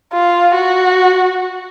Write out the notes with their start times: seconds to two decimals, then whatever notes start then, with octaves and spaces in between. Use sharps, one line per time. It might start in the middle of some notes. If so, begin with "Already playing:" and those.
0.13 F4
0.55 F#4